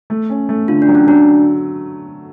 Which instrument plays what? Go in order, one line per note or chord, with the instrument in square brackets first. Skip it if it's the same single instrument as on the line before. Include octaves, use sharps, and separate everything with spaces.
[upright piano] A3
C#4
A3
[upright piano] D3 [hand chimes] F4
[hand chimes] D4
[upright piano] F#3
[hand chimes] C#4
[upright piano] F#3 [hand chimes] D4